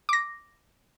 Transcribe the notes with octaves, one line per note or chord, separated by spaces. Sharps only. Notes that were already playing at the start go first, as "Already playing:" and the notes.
D6 A#6